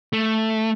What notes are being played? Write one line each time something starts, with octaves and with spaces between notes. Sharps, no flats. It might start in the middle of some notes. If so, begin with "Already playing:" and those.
A3